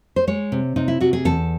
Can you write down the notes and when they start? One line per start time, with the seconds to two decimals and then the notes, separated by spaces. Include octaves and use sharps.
0.16 C5
0.27 G#3 C#5
0.52 C3
0.76 C3 D#4
0.88 E4
1.00 C3 F#4
1.13 G#4
1.25 E2 A4